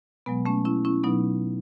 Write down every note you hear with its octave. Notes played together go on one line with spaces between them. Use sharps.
B2 F#3 G#3 B3
A3 C#4
C#4 E4
C#4 E4
B2 F#3 B3 D#4